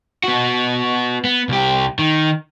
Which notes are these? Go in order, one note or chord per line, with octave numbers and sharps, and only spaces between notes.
B3 F#4
B3
C2 G4
D#3